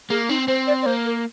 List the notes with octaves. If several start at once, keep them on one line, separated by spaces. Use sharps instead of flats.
A#3 G#4
C4 D#4
C4 C5
D5
D5
A#3 C5
A#4